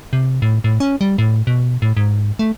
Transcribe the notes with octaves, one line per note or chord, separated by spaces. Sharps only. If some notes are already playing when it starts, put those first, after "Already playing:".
C3
A2
A2
C#4
G3
A2
B2
A2
G#2
A3